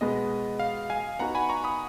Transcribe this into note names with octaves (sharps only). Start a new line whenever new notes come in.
B2 G#3 B3 D#5
F5
F5 G#5
B3 D#4 F#4 F#5 A#5
G#5 B5
A#5 C#6
B5 D#6